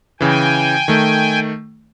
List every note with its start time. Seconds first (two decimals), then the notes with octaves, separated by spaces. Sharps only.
0.21 C#3 E3 G5 G#5
0.88 D#3 A3